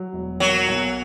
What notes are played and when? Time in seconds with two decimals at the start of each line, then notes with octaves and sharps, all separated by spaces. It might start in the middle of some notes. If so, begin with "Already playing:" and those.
Already playing: F#3
0.13 E1
0.40 F#3 A#3
0.68 B1